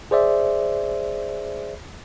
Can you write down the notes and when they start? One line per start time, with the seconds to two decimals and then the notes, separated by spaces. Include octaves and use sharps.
0.11 G#4 C5 D5 E5